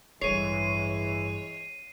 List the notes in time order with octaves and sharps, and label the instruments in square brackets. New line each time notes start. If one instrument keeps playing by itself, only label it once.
[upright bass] A1 G2 [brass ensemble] E3 G#3 [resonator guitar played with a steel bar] C#5 [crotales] C7 D#7